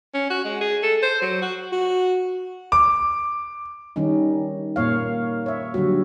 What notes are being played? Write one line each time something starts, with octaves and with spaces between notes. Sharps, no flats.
C#4
F#4
G#3
G#4
A4
C5
F#3
F#4
F#4
D6
D#3 G3 C#4 D#4
A#2 A#3 C#5 F5
C#5 E5
D3 F#3 G3 F#4